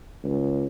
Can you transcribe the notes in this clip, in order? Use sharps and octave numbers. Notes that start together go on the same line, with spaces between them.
C#2